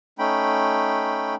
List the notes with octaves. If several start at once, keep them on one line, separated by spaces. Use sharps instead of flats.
A3 C#4 D#4 G5 B5